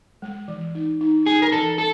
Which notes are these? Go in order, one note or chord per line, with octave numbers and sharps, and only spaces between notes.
G#3
E3
D#4
D#4
D#4 G#4
A#4
E3 A4
A4